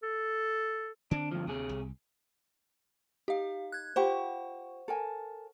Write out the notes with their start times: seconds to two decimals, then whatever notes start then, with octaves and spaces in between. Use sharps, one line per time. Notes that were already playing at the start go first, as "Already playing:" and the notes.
0.03 A4
1.11 D3 C4 D4
1.31 G2 F3
1.47 D2 C3 G#4
1.69 C2
3.28 D#4 G4 F5
3.72 F#6 G#6
3.96 F4 G4 C5 F#5 B5 C#6
4.88 A4 A#4 G#5